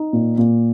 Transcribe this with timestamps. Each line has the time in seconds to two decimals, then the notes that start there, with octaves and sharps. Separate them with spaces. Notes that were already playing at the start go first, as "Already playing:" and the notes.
Already playing: D#4
0.13 A#2
0.38 A#2